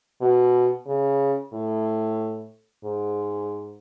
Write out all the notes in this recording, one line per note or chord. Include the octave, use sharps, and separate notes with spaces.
B2
C#3
A2
G#2